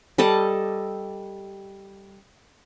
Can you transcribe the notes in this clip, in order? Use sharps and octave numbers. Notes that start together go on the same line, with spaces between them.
G3 A4 D#5 A5